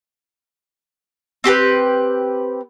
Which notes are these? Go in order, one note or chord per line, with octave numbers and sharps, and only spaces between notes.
C4 G4 A4 B4